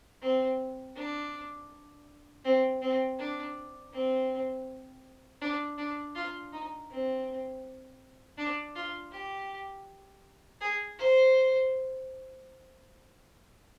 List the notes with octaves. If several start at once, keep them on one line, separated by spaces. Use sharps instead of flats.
C4
D4
C4
C4
D4
C4
D4
D4
F4
D#4
C4
D4
F4
G4
G#4
C5